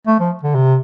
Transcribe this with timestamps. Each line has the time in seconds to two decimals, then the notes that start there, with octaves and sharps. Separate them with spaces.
0.07 A3
0.20 F3
0.43 D3
0.55 C3